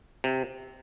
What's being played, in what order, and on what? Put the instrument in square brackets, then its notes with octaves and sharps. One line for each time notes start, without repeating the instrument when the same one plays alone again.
[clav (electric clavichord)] C3